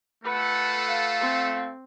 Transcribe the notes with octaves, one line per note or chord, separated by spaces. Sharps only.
A3 F4 A4 B4 F#5
F5
C4